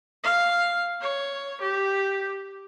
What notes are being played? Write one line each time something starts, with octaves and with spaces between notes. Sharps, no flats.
F5
C#5
G4